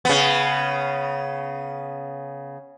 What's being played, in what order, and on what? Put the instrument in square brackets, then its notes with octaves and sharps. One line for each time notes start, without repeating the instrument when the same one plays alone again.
[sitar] C#3 B3